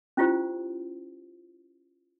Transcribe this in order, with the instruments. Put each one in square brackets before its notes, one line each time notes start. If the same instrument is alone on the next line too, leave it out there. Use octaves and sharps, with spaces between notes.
[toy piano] C#4 E4 F4 G4 C5